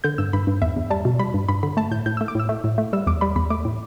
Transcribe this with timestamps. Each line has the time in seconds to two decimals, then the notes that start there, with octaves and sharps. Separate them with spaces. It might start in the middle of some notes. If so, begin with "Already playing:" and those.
0.04 D3 G6
0.18 G2 E6
0.33 G2 B5
0.47 G2
0.62 E2 E5
0.76 E2
0.90 G3 A5
1.05 B2
1.19 G3 B5
1.34 G2
1.49 G2 B5
1.63 D3 B5
1.77 A3 A5
1.91 A2 G6
2.06 A2 G6
2.17 A3 E6
2.28 D6
2.35 A2 E6
2.49 A3
2.64 A2
2.78 A3
2.93 G3 E6
3.07 E2 D6
3.21 G3 B5
3.36 E2 B5
3.50 A3 D6
3.65 A2